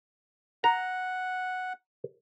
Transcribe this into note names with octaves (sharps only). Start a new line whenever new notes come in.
F#5 A#5